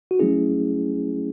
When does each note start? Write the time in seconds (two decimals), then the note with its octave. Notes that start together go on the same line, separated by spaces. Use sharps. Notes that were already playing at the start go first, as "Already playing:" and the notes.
0.11 F#4
0.19 F#3 A3 C#4 E4 G#4